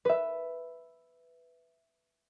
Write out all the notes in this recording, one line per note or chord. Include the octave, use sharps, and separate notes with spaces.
B4 E5